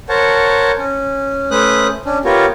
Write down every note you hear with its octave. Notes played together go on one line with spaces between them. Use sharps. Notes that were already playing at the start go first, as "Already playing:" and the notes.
A#4 C5 C#5 F#5 A5
C#4
A3 C#4 B4 C5 D#6 F#6
C#4 D4
B3 F4 G4 A#4 C#5